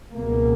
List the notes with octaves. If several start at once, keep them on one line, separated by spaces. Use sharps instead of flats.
C#2 B2 A#3